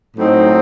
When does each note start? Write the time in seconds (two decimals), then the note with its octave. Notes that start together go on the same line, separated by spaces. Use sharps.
0.17 A2 F#3 C4 D#4